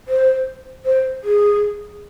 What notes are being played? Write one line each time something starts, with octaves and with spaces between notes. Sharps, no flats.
C5
C5
G#4